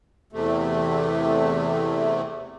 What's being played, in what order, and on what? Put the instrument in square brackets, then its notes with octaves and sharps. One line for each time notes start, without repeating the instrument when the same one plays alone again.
[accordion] E2 C3 A3